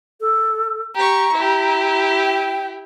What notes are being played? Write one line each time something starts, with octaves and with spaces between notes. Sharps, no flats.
A4
G4 A#5 C#6
E4 G4
G5